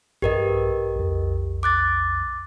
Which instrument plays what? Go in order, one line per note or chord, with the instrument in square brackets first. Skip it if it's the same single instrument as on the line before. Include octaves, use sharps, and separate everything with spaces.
[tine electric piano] A#1 G2 B4 [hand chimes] G4 A#4 D#5
[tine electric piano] B1 F2
[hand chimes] D6 F#6 A6